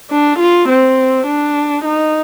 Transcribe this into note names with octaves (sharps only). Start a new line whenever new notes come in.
D4
F4
C4
D4
D#4